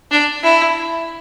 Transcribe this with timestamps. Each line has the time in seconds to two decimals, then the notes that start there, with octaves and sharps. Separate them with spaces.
0.11 D4
0.43 E4